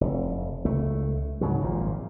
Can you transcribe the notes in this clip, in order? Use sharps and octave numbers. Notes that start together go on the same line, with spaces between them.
F1
C#2 A3
G#2 C#3 F#3
G#1 A#2 F3